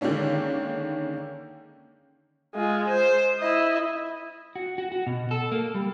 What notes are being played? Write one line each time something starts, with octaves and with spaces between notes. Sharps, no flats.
D3 D#3 G#3 A#3 C#4 D4
G#3 F4
C5
E4 D#5
F#4
F#4
F#4
B2
A4
A#3
G3